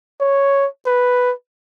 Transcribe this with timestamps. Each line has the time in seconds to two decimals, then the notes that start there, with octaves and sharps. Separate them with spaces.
0.20 C#5
0.86 B4